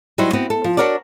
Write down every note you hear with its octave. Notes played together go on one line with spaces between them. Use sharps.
F#3 G3 D#4 E4 C5
B3 C4 F#4
A4
F3
D4 F#4 A#4 C#5 D5